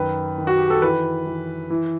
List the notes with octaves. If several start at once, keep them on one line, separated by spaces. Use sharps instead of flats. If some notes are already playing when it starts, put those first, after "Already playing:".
Already playing: F#2 D#3 B4
D#3
F#4
G4
A4
E3 B4
E3
E3